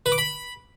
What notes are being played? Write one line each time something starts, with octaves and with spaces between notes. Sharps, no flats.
B4
D6
B5